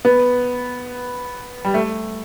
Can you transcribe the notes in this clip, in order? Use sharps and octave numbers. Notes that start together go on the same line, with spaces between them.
B3
G3
A3